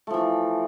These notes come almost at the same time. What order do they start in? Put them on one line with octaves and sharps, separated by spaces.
A3 F3 E3